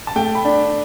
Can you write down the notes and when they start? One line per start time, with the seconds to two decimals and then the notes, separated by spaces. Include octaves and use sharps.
0.07 A5
0.16 A3 G5
0.35 B5
0.45 D4